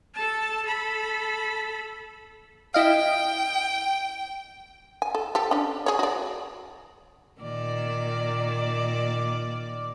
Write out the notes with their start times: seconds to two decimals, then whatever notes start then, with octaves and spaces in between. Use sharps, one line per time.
0.15 A4 A5
0.65 A4 B5
2.74 E4 D#5 F5 G5
5.02 G#5
5.15 A4
5.35 G4 A4
5.51 C#4 D4
5.86 G#4 C#5
5.99 F#4 D5
7.41 A#2 D#3 D5